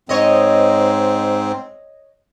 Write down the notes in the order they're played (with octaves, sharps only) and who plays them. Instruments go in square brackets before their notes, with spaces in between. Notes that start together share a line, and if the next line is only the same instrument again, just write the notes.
[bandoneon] G#2 C4 [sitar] C#5 D#5